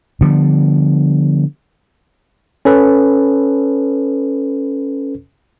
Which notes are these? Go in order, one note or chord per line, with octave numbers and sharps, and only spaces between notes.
D3 F3 G3 B3
C#4 A4 B4